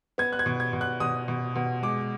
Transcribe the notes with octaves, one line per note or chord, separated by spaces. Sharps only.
B3 G#6
F#6
G#6
B2
G#6
B2
F#6
B2 D#6
B2
B2
G#3 D6